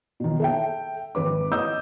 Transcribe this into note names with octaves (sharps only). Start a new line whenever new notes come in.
B2 D#3
A4 E5 G5
G#1 B4 D6
D#5 D#6 E6 G6